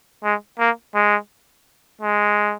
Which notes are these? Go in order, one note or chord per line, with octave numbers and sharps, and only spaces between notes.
G#3
A#3
G#3
G#3